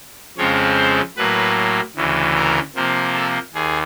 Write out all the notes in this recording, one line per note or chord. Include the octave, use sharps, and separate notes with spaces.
F2 C#3 F3 G#3 C4 C#5
C5
A2 F#3 A#3 B4
D2 C#3 E3
A#4
C3 F3 A#3
A4
D#2 G#4